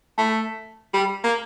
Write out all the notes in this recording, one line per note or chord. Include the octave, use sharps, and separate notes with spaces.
A3
G3
A#3